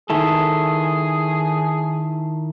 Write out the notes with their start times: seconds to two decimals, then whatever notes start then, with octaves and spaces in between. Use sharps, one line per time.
0.10 D#3 E4 G#4 A4